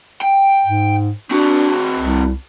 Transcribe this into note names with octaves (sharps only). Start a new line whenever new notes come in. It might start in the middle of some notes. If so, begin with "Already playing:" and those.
G5
G#2
C4 D4 F#4
C2